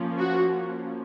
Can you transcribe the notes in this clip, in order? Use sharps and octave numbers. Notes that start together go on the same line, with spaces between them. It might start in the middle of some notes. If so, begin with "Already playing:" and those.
Already playing: F3 A#3 C#4
F#4